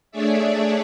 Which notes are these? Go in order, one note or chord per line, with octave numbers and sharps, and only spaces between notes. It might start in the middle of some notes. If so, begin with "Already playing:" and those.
A3 D4 G#4 C#5 D5 E5